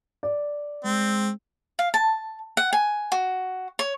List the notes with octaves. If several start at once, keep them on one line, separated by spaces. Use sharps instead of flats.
D5
G#3 C4
F5
A5
F#5
G#5
F#4
C#5